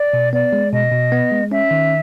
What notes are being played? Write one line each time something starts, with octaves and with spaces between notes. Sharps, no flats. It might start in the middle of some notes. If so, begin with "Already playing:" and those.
Already playing: D5
B2
B3 D5
G#3
B2 D#5
B2
B3
G#3
C#4 E5
D#3